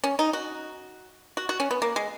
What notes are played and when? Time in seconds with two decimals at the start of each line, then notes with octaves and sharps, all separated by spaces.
0.04 C#4
0.19 D#4
0.33 F#4
1.37 F#4
1.49 F#4
1.60 C#4
1.71 B3
1.82 A#3
1.96 G#3